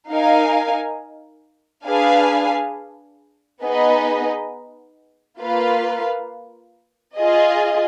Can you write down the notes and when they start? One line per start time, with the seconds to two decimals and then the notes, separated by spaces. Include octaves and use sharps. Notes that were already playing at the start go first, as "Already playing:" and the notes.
0.10 D#4 A#4 F5 G#5
1.86 D4 G#4 B4 F5 G#5
3.63 B3 D#4 G#4 B4 D#5
5.40 A#3 F4 B4 F5
7.17 F4 G#4 D#5